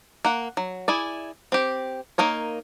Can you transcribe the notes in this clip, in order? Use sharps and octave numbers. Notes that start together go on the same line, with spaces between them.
A#3 F#5
F#3
E4 G#4 D5
C4 G4
A#3 D#4 A#4 C#5